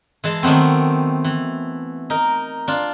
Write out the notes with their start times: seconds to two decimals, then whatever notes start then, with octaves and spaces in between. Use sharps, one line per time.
0.24 E3 G#3 A5
0.43 D#3 F#3 A3 B3 C4
1.24 E3
2.10 D#4 A#4
2.68 D4 F4